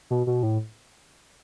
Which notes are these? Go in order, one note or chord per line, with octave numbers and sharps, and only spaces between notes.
B2
B2
A2